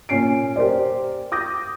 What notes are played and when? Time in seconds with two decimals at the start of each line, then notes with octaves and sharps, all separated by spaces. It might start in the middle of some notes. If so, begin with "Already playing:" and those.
0.09 A#2 C#4 C7 D7
0.56 G4 A#4 C5 D5
1.32 D6 D#6 G6 A#6